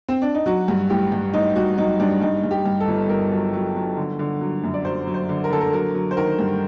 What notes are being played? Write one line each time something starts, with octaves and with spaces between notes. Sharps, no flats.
C4
D4
D#4
F#3 F#4
G2
A1 G4
G2
A1 D#4
G2 F#4
F#3 D#4
G2 D4
G2 D#4
G2
G4
G2
A4
G1
G2 A#4
F#3
F#3
F#3
D3
D3
F#3
F#2
D5
F#3 C5
F#3
C5
D3
A#4
D3 A4
A#4
F#3 A#4
F#3
C5
D#3 A#4
G2